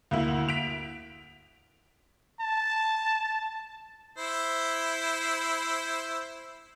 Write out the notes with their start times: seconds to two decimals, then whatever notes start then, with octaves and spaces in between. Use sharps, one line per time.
0.11 D2 A#3 E4
0.49 B6 D7 F7
2.41 A5
4.18 E4 C5